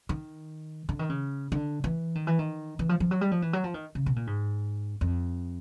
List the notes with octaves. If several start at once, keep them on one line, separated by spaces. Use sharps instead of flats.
D#3
D3
D#3
C#3
D3
E3
D#3
E3
D#3
E3
F3
F3
F#3
G3
F3
E3
F#3
F3
D#3
C#3
B2
A#2
G#2
F2